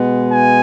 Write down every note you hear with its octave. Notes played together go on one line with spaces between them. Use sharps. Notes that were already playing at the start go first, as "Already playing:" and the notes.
Already playing: B2 G#3 B3
G#5